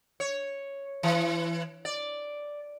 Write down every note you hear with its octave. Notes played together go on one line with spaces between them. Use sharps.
C#5
E3
D5